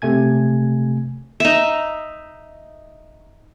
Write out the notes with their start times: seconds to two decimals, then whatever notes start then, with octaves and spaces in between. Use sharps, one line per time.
0.02 C3 A3 G#5 G#6
1.40 D#4 E5